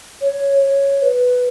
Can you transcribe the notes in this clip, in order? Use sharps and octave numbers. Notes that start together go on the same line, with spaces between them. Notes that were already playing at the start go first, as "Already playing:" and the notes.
C#5
C#5
B4